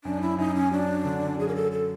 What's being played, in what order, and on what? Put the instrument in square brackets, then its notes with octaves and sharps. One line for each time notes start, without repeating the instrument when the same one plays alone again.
[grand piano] F#2 [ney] D4
[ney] E4
[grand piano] F#2 [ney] D#4
[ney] C#4
[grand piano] F#3 [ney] D4
[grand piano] D3
[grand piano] F#2 [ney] G#4
[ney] A#4
A4
A4